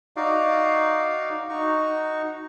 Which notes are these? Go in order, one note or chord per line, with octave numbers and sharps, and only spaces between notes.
D#4 F#4 D5 F5
D#4 F#4 C#6